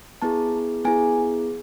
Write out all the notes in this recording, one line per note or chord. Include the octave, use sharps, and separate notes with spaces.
B3 E4 G#4 A5
B3 E4 G#4 G#5